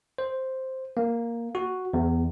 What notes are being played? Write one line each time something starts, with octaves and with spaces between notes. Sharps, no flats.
C5
A#3
F#4
E2